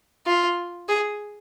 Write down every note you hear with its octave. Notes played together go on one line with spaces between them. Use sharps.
F4
G#4